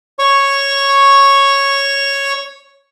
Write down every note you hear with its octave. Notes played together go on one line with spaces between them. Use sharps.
C#5 C#6